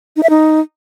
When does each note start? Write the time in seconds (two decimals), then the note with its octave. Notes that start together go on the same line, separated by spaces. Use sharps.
0.16 D#4
0.23 E5
0.30 D#4